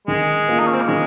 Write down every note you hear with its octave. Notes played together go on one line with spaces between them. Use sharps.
D#3 G#3
A#3 F4 A#4
D#4
C#4
C4
A#3
D#3 G#3